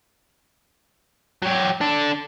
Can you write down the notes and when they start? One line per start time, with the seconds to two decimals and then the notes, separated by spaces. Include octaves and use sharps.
1.42 F#3 G4
1.81 D4 A4